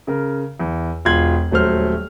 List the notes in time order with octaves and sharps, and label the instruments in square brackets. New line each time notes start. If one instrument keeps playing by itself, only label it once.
[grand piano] C#3 A#4
E2
E1 F4 C6 G#6 F#7
D#1 F#3 A3 C5 F6